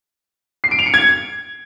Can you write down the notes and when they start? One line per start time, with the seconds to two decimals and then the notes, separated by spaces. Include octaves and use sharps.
0.64 C7
0.71 D7
0.79 F7
0.86 C#7
0.94 G#6